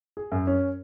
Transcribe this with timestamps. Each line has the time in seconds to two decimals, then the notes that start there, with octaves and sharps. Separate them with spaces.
0.17 G#4
0.32 F#2
0.47 C#4